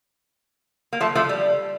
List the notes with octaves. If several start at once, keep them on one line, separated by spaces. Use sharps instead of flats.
A#3
F3 A3
F3 A3
G3